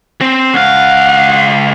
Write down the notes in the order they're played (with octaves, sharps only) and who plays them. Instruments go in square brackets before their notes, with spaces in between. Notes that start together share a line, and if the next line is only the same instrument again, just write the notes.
[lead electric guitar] C4
[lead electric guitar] C#2 F5 [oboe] F#5